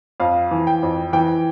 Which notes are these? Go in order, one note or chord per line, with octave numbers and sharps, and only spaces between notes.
F2 F5
E3
G5
F2
E3 G5